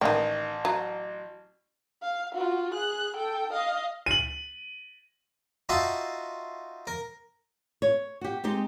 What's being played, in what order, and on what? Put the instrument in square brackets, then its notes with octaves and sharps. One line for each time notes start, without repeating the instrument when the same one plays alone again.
[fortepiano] A1 [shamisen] D#3 G5
[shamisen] F#3
[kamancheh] F5
F4 F#4
G#4 F#6
A4 G5
D#5 F5
[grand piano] D#7 F#7
[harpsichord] D#4 F4 F#4 E5 A5 C6
A#4
[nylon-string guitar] C#5
F#4 G4
G#3 C4 D#4 G4